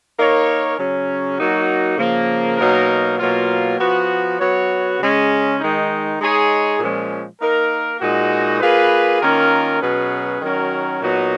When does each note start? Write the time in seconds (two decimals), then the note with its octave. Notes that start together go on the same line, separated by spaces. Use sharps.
0.18 A#3 D#4 A#4 C#5
0.77 C#3 F#3 C#4
1.38 F#3 A#3 D#4 F#4
1.98 C#3 F3 A#3
2.58 B2 F#3 A#3 D#4 A#4
3.18 B2 F#3 A#3 F4
3.79 F3 B3 F#4
4.39 F#3 B3 F#4 C#5
4.99 C#3 G#3 C#4
5.60 D#3 G#3 D#4
6.20 G#3 D#4 G#4 C#5
6.79 A#2 F3 G#3 C#4
7.41 A#3 D#4 A#4
8.00 A#2 G#3 D#4 F#4
8.60 A#3 F4 G#4 B4
9.21 D#3 A#3 C#4 F4 A#4
9.81 B2 F#3 C#4 G#4 B4
10.41 D#3 F#3 C#4 F#4 A#4
11.01 A#2 F#3 B3 D#4 F#4